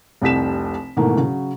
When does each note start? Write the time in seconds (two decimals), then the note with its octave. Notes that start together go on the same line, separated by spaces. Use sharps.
0.22 F1 C2 G4 B6 E7
0.97 G#2 B2 D#3 E3 A3 A#3
1.17 C#3 F#3